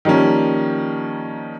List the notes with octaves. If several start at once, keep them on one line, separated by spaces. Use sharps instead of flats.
D#3 F3 G3 A#3 C#4